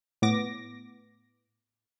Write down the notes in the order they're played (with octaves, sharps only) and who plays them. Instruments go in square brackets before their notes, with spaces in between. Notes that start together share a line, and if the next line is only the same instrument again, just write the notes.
[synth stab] A2 B3 D6 A#6